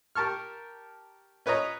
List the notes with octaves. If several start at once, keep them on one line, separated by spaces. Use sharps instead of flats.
G4 A#4 A5 C#6 F6
C#4 B4 C#5 D#5 A#5